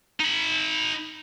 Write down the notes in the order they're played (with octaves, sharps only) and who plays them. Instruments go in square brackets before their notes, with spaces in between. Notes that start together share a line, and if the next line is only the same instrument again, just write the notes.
[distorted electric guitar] D#4 B5